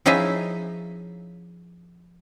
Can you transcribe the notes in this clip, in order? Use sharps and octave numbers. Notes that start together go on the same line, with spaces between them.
F3 C#4 D#4 E4 G#4 E5